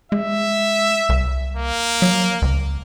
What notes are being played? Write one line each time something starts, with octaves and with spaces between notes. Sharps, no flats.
G#3 E5
C2
A#3
F#3
C#2